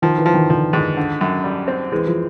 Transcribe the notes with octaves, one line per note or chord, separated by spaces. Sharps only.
D#3 F3
E3
F3
D#3
D3 F3
G#2 D#3
D3
F#2
G3
C4
E3 G#3
F3